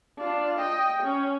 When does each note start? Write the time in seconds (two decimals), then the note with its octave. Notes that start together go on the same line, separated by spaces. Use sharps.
0.18 D4 F4
0.59 D#5 G5
1.03 C#4